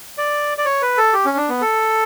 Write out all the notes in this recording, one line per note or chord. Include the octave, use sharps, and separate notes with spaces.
D5
D5
C#5
B4
A4
G4
C#4
D4
B3
A4